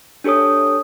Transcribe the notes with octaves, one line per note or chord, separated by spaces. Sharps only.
D4 G4 A4 C#5 D#6